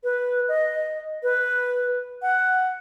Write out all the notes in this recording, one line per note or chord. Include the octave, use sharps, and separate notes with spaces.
B4
D#5
B4
F#5